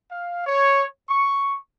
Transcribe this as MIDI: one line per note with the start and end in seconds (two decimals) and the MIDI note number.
0.11 0.44 77
0.46 0.84 73
1.09 1.57 85